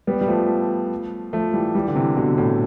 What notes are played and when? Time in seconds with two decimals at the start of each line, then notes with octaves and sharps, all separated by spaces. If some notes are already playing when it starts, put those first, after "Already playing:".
0.07 G3 B3
0.21 G3
0.28 F3 A3
1.33 F3 A3
1.53 E3 G3
1.75 E3 G3
1.88 D3
1.96 C3 E3
2.17 B2 D3
2.38 A2